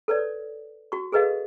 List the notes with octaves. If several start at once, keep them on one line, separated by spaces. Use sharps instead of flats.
A4 B4 C#5 D5
F#4 C#6
G#4 A4 B4 D#5 F5